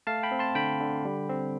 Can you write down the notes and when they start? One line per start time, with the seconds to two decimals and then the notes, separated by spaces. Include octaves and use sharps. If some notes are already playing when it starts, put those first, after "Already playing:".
0.07 A3 F5 A5
0.23 G5 B5
0.31 C4
0.39 A5 C6
0.55 D3 G5 B5
0.80 D3
1.05 G3
1.29 C4